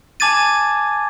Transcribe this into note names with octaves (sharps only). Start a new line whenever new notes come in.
G#5 A5 D6 G#6 A6 D#7